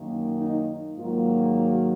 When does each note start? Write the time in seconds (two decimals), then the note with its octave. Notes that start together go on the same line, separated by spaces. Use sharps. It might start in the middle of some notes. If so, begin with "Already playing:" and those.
Already playing: F#2 D#3 A#3
0.37 D#4
0.96 G#2 D#3 F#3 A#3 F4
1.56 F#4